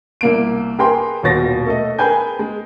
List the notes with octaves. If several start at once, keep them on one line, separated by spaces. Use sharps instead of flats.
C2 A#3 D7
G4 G#4 A#4 B4 G5 C6
D#1 D#2 B2 C#5 A6 A#6
A3 A4 D#5
G#4 A#4 B4 G5 G#5 G6
G#3